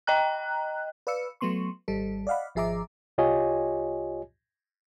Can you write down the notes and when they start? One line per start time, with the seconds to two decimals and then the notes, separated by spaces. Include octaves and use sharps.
0.07 D#5 G5 A#5 F#6
1.07 B4 D5 F5 E6 C#7
1.41 F#3 A3 B3 C6 C#6
1.88 G#1 G3 A4
2.27 D5 D#5 F5 F#5 B5
2.55 G#1 F3 G#4 E5 A#5 D6
3.18 C2 F4 G4 C#5 D#5 G#5